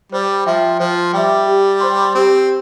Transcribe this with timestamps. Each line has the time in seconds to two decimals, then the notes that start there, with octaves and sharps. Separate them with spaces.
0.12 G3 C5
0.46 F3 E5 G5
0.79 F3 C5
1.14 G3 E5 G5
1.47 G4
1.81 C5 G5 C6
2.15 C4 G4